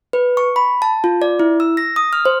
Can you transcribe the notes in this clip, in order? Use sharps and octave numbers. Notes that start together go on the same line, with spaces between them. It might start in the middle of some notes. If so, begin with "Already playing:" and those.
B4
C#6
B5
A5
F4
D5
E4
E6
A#6
D#6
F6
C5